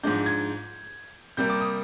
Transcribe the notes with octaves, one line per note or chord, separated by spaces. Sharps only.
G#2 F3 G#3 D4 G6
G#6
C3 G3 A#3 G6
D6
D#6